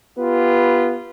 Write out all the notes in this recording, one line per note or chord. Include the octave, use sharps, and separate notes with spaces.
B3 F4 G4 B4